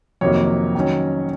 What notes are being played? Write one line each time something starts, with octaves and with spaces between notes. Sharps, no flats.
F2 C3 D#3 F#3 A#3 C#5
D#3 F#3 C#4